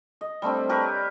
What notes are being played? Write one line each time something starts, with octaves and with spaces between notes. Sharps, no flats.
D#5
G3 A3 C4 D4
G4 A#4 B4 C#5